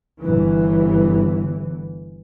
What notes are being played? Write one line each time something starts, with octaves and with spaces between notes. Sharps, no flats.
G1 E3